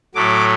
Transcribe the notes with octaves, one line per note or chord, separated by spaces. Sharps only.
A2 F#3 A3 D6